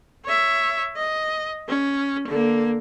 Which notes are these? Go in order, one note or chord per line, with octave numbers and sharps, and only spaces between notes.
C#5 E5
D#5
C#4
D3 A#3